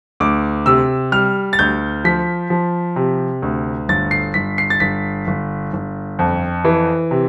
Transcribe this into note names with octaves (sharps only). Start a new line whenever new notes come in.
D2 D6
C3 E6
G3 F6
A6
D2 G6
F3 B6
F3
C3
D2
G1 A6
C7
G1 B6
C7
A6
G1 B6
G1
G1
F2
E3
C3